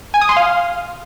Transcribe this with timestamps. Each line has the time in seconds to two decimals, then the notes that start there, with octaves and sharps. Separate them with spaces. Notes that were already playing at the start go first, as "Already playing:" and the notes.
0.14 G#5
0.21 D#6
0.29 C6
0.37 F5